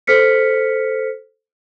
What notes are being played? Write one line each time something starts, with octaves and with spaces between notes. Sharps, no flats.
A4 C5 F6 B6 C#7